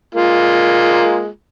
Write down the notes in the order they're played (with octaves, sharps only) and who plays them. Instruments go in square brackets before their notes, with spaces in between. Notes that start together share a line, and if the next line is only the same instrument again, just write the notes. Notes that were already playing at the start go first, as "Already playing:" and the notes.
[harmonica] G#3 A#3 F4